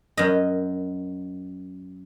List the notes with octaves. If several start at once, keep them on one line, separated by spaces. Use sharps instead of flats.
F#2 D#5